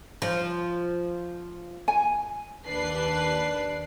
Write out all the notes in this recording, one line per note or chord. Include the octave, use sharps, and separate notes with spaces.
F3
G#5
D#2 D4 B4 C7